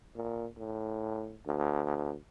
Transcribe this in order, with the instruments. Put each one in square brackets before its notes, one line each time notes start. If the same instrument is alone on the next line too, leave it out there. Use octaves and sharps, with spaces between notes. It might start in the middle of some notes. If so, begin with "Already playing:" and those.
[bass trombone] A#2
A2
D2